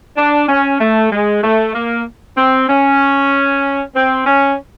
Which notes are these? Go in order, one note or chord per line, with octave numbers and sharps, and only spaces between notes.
D4
C#4
A3
G#3
A3
A#3
C4
C#4
C4
C#4